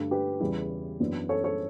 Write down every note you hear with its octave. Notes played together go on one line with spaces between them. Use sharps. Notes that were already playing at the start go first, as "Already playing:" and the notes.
Already playing: G2 D3 A3
G4 B4
E2 C#3 G3 C#4 E4
F#2 E3 B3 D4
A4 C#5
A4 C#5